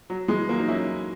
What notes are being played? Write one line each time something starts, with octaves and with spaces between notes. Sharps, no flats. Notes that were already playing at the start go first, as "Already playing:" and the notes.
F#3
E3 G#3
F#3 A#3
D#4
C#4 E4